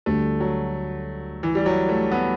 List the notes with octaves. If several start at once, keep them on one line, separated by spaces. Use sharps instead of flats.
D2 D3 G3 A3
F#3
E3
G3
F#3
A3
B3